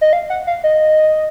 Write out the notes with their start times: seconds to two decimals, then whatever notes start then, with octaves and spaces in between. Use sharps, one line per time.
0.01 D#5
0.13 F5
0.30 F#5
0.47 F5
0.64 D#5